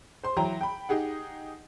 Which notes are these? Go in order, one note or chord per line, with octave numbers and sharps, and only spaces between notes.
C5 C6
E3 F#3 G5 A#5
G5 B5
D#4 G4 G#4 F#5